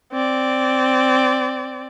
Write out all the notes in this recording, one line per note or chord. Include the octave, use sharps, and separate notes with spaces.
C4 D5